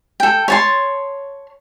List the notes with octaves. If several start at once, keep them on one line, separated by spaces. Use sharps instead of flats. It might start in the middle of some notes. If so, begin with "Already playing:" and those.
A4 G5
C#5 A5 C6